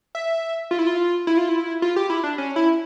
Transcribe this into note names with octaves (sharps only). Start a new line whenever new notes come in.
E5
F4
E4
F4
E4
F4
E4
F4
G4
E4
D4
C#4
E4